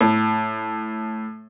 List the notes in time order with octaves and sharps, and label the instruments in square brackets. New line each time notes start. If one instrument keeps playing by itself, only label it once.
[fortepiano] A2